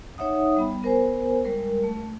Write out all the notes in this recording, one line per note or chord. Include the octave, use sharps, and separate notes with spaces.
D#4 C#5 E5 F#5 D#6
G3 B3 B5
B3 A#4 C5 G#5
G3 G#3 A#4
A3